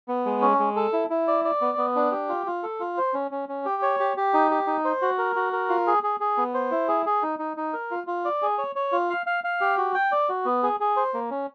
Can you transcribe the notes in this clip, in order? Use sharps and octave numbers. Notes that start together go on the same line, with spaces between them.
B3
G#3
C#4
G#3
A4
E4
E4
D5
D5
B3
B3
D4
G4
F4
F4
A4
F4
C5
C#4
C#4
C#4
G4
C#5
G4
G4
D#4
G4
D#4
C5
F#4
A#4
F#4
A#4
F4
G#4
G#4
G#4
B3
C5
E4
G#4
G#4
D#4
D#4
D#4
A#4
F4
F4
D5
G#4
C#5
C#5
F4
F5
F5
F5
G4
F#4
G5
D5
F#4
B3
G#4
G#4
C5
A#3
C#4